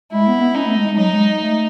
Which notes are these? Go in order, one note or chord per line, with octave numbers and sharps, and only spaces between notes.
G#3 E4
B3
B3
C#4 D#4
A3
G#3
G#3
F#3 D#4
G#3
A3